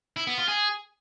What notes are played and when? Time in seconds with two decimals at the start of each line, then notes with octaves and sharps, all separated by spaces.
0.17 E4
0.27 B3
0.38 F4
0.48 G#4